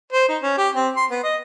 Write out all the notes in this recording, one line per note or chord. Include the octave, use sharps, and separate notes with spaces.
C5
D#4
C#4
G4
C4
C6
B3
D#5